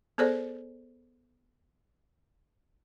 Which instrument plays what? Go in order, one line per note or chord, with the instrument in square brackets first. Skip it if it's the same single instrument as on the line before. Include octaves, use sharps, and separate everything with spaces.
[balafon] B3 G#4 A4 C5 D5